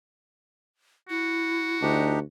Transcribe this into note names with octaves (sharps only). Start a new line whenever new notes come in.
E4 F#4
D2 D4 D#4 G4